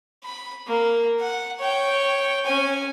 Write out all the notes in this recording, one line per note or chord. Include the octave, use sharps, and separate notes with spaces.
B5
A#3
F#5
C#5 G5
C#4 G#5